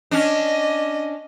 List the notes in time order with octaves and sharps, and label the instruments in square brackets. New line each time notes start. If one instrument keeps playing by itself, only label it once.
[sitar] C#4 D4 [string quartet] D#5